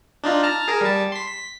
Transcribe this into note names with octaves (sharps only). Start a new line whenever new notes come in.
D4 D#4 F4
A5 A#5 F6
G#4 A#4
G3 A5
C6 B6
B6